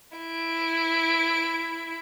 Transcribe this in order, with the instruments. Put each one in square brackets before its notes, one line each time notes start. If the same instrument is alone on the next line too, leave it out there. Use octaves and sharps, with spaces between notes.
[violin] E4 D7